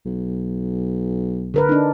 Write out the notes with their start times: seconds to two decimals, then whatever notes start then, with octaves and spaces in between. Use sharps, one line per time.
0.05 B1
1.54 D3 A#4 B4
1.69 D4 D#4